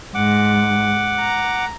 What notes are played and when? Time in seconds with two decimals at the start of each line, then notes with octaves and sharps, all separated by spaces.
0.14 G#2 F#5 D6
1.20 A#5